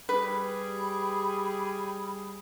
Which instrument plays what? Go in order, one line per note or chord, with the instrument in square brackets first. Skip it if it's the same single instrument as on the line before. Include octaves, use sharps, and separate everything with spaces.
[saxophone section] G3 G#4 [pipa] B4 [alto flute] B5